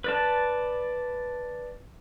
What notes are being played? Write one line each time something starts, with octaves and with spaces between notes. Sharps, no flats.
B4 D5 A5